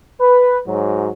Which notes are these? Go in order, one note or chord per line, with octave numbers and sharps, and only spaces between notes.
B4
G#2 F#3